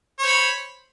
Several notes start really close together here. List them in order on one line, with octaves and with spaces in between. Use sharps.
C#5 C5 B5